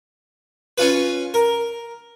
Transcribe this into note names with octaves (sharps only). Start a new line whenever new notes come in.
C#4 F4 B4
A#4